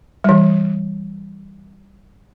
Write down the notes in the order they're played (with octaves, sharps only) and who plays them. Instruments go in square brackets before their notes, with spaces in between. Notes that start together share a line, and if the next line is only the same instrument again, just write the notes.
[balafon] E3 G3